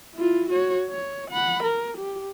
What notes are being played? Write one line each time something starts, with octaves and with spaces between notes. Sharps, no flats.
E4 F4
F#4 C#5
C#5
F#5 B5
A#4
G4